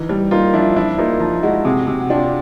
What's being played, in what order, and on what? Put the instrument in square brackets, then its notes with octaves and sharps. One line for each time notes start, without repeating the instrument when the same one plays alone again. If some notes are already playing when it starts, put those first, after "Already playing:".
Already playing: [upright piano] E3 [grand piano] D#4
[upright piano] G3
[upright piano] A#3 [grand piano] D#4 F4
[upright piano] F3 [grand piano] D4 E4
[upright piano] F3 [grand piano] D4 E4
[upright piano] A#3 [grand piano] D#4 F4
[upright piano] F3 [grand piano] D#4 F4
[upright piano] G#3 [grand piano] E4 F#4
[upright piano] C3 [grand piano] F#4 G#4
[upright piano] C3
[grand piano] F#4
[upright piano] D4 [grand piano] F4 G4